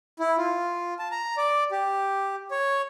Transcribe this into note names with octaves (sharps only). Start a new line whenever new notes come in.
E4
F4
A5
A#5
D5
G4
C#5